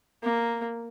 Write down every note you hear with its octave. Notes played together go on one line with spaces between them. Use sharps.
A#3